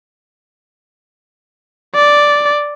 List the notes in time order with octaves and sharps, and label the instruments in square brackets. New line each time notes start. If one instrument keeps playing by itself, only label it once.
[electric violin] D5